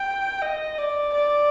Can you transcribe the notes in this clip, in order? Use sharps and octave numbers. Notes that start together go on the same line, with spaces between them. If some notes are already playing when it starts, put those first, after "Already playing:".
Already playing: G5
D#5
D5
D5